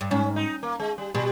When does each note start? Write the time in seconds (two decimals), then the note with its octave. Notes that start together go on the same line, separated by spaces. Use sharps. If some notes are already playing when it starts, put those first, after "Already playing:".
0.01 G2
0.11 G#2 C#4
0.36 D#4
0.63 A#3
0.80 G#3
0.98 G3
1.14 B2 G3